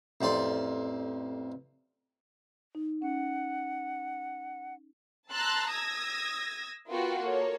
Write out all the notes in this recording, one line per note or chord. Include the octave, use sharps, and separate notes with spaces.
A1 F2 D5 C6
D#4
C#4 F#5
A5 A#5 C6 E6 F#6 A6
D#6 E6 G#6 A#6
B3 F4 F#4 A#4 G5
A#3 A4 C#5